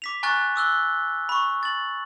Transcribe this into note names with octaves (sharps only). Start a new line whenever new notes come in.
D6 B6 F7
G#5 A#5 C#6 F6 F#6 A6
D6 E6 F#6 G7
B5 C#6
A6 F#7